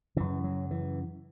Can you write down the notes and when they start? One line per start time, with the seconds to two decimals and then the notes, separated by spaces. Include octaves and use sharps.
0.16 F#2 C#3 E3
0.44 F#3
0.71 E3